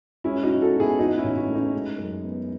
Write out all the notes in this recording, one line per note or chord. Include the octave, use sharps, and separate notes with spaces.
G#3 C#4 E4
D#4 F#4
G#2
F#4 A4
B3
E4 G#4
E3 D#4 F#4
C#4 E4
A1
C#4
A3
D#4
G#3
F#2
B3